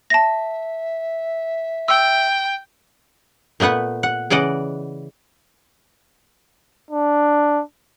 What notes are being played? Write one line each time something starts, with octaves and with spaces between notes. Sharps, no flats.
E5 A5 A#6
G5 E6
A#2 A3 B3 B4 F#5
F#5
C#3 E3 D5 D#5 F#5
D4